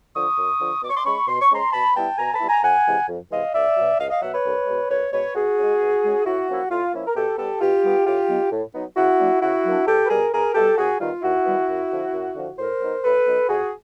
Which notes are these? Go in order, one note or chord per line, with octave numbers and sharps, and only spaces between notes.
D3 F3 C#6 D#6
F#2
D3 F3
B2 D6
C#6
C6 D6
G#3 C#4 B5 C#6
B2 C6
C#6
G#3 C#4 A#5 C6
B2 A5 B5
G3 B3 E4 G5 A5
B2 G#5 A#5
A5 B5
G3 B3 E4
G#5 A#5
F2 F#5 G#5
C3 E3 G#3
F2
C3 E3 G#3 D#5 F5
C#2 D5 E5
B2 F#3
C#2 D#5 F5
D#5 F5
B2 F#3 E5 F#5
B4 C#5
C2
B2 G#3
C2 B4 C#5
B2 G#3 B4 C#5
B2 F#4 G#4
G#3 C#4
B2
G#3 C#4
A2 E4 F#4
F3 A#3 C#4 E4
A2 F4
F3 A#3 C#4 E4
A#4
B2 G4 A4
G3 B3 G4 A4
B2 F4 G4
G3 B3
A2 F4 G4
F#3 B3 D#4
A2
F#3 B3 D#4
C#3 E4 F#4
F#3 A#3 D4
C#3 E4 F#4
F#3 A#3 D4
E2 G4 A4
B4
B2 G3 G#4 A#4
E2 G#4 A#4
B2 G3 G4 A4
D#2 F#4 G#4
D#3 G3 B3 F4
D#2 E4 F#4
D#3 G3 B3
F#2
D3 F3
F#2
D3 F3
A2 A#4 C5
F#3 B3 D#4
A2 A4 B4
F#3 B3 D#4
F2 F#4 G#4